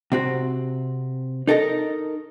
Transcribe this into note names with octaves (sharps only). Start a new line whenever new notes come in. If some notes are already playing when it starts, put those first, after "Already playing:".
C3 C4 F#4
D#4 A4 A#4 D#5